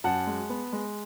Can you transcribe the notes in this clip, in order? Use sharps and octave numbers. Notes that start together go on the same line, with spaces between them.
F#2 F#5 A5
G#3
B3
G#3